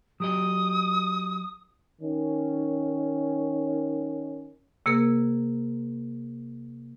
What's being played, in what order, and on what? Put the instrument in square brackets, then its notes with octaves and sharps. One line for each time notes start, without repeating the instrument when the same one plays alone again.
[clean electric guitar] F#3 G4 D#5 [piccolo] D#6
[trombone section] D#3 C#4
[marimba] C3 A#3 G#4 A#4 E6